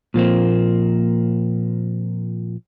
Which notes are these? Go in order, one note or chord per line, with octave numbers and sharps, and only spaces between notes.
A#2 F3 A#3 C4